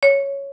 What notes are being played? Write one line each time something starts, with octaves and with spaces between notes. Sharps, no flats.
C#5